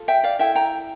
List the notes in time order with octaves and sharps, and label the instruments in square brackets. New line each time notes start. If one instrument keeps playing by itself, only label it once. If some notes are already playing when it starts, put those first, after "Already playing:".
Already playing: [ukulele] F4 A4
E5 G5
D5 F5
E4 A4 E5 G5
G5 A#5